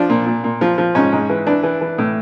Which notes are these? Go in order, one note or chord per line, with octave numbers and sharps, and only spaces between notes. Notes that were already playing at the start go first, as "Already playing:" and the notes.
Already playing: F3 D4
A#2
A#2
A#2
F3
F3
G#2 C#4
G#2
E3
E3 D4
E3
E3
A2